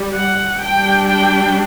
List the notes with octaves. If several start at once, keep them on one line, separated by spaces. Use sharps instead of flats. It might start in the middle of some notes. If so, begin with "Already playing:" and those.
Already playing: G3
F#5
G3 D4 G5
G5